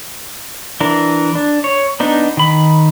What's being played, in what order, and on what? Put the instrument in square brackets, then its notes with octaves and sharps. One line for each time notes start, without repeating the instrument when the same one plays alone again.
[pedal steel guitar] E3 D4 A#4
D4
C#5
B3 D4 D#4
D#3 B5